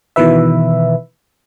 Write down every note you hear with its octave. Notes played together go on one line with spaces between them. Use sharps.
B2 D#3 E3 B4 E5